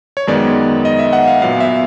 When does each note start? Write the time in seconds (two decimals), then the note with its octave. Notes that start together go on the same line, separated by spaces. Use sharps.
0.17 C#5
0.27 F#2 D#3 G#3 B3 D5
0.85 D#5
0.99 E5
1.13 F#5
1.28 F5
1.42 A#2 F#3 B3 F5
1.60 E5